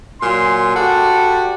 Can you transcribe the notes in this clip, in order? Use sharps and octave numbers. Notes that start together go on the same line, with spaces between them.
A#2 F#3 G#5 C6
F#4 G4 A4 B4 D5 A5